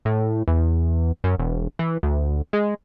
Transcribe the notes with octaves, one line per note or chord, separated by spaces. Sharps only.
A2
E2
F#2
E1
E3
D2
G#3